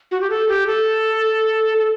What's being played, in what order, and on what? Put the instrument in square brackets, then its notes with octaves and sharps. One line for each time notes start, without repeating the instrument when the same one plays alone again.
[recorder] F#4
G4
A4
G4
A4
A4